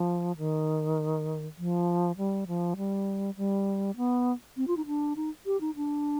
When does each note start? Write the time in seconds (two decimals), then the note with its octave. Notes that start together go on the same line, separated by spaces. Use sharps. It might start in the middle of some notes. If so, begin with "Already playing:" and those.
Already playing: F3
0.38 D#3
1.58 F3
2.17 G3
2.47 F3
2.77 G3
3.37 G3
3.97 B3
4.57 C4
4.67 F4
4.77 D#4
4.87 D4
5.16 D#4
5.46 G4
5.61 D#4
5.76 D4